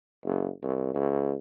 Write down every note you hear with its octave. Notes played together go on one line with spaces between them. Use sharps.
F#1
C2
C#2